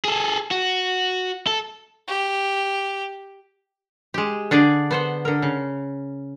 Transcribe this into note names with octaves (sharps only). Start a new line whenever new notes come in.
G#4 A4
F#4
A4
G4
G#3 G4
D3 D4 G#4 D5
B3 C5 F#5
D3 A#4
C#3